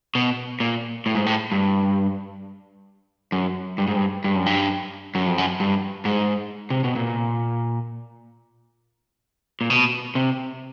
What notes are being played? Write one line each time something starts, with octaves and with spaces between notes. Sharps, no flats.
B2
A#2
A2
G#2
A2
G2
F#2
G2
G#2
G2
G2
F#2
G2
F#2
F2
F#2
G2
G#2
C3
B2
A#2
A#2
B2
C3